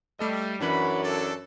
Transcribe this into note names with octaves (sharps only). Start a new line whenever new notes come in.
G3 A3 A4 D#5
F#2 E3 C#4 D4 D5 F#5 B5
A4 D5